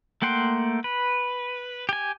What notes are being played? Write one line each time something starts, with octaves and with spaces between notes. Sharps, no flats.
A3 A#3 F#5 G5 C6
B4
G4 G#5